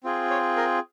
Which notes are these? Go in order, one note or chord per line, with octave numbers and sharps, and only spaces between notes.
C4 F4 G#4
C#5
A#4